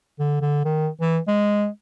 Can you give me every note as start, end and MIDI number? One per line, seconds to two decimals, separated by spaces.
0.19 0.41 50
0.41 0.63 50
0.65 0.88 51
1.01 1.18 52
1.28 1.67 56